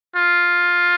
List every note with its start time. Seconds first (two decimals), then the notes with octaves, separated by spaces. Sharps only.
0.16 F4